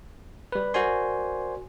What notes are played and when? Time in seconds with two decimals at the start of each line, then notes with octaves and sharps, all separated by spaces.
0.52 G3 B4
0.74 F#4 A#4 C5 D5 G#5 C6